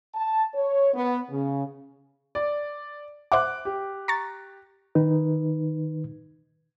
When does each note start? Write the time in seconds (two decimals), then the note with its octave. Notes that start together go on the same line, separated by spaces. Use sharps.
0.15 A5
0.54 C#5
0.94 B3
1.31 C#3
2.35 D5
3.32 C5 E5 F#5 D6 F#6
3.65 G4
4.08 A#5 C#6 A6
4.95 D#3 D#4 B4